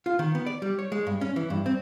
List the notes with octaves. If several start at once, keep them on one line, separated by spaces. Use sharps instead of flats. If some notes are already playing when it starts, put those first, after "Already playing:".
F4
D#3
B3
D5
G3
C#5
G#3
G2
C#4
E3
G2
C4